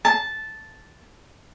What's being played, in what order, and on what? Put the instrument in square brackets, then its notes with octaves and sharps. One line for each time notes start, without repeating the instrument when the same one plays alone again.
[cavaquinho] A5